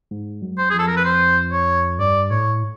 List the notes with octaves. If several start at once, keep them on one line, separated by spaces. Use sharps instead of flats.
G#2
F#2
C5
F2 G#4
A4
A#4
B4
C5
C#5
G2 D5
A2 C#5